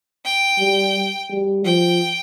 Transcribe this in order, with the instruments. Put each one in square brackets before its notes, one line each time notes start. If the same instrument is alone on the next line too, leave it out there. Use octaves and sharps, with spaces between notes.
[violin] G5
[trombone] G3
G3
[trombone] F3 [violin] G5